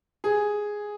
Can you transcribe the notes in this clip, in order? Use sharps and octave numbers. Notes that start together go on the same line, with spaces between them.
G#4